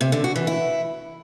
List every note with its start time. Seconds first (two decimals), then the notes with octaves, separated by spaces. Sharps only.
0.01 C3
0.12 D3
0.24 F#4
0.36 E3
0.47 E4